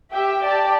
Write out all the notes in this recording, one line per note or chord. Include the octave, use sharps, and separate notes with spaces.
G4 E5 G5
G4 D5 A5